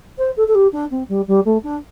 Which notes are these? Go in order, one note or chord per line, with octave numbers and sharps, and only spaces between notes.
C5
A4
A4
G4
D4
C4
G3
G3
A3
D4